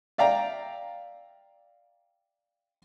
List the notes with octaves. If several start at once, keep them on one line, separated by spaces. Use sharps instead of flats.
D5 E5 F5 G5 A#5